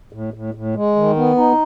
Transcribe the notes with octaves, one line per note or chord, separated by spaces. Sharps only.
A2
A2
A2
G#3
D#3
B3
D#4